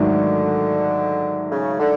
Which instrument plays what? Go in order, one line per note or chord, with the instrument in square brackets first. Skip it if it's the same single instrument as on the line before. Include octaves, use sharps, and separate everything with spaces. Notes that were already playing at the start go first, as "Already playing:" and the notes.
Already playing: [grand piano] G#2 D#3 F#3 A3 [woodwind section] D3
[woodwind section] C#3
D3